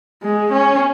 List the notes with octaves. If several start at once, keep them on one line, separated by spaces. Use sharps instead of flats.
G#3
C#4